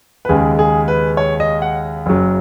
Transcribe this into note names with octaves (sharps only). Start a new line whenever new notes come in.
B4
D#2 C#3 G#3 G#4
G#4
B4
C#5
D#5
F#5
F#1 F#2 C#3 F#3